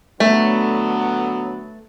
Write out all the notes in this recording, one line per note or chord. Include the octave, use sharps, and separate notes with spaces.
D3 F#3 A3 B3